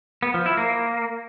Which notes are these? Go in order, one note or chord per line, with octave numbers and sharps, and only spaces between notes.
B3
F3
E4
A#3